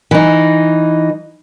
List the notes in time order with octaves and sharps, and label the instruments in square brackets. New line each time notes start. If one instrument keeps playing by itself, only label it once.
[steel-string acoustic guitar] E3 D#4